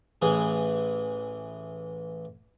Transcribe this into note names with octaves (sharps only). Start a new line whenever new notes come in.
A1 E3 G#4